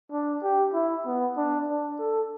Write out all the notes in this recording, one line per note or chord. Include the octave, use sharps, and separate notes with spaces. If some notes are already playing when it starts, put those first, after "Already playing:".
D4
G4
E4
B3
D4
D4
A4